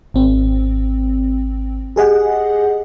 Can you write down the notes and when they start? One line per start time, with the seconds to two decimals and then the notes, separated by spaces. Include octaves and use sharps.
0.14 G#1 C4
1.96 G4 G#4 D#5 F#5